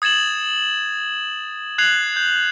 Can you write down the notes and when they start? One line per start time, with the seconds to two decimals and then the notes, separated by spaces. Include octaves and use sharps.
0.02 D#6 G#6 A6 E7 F#7
1.78 F#6 G#6 C7 F7 F#7
2.16 G6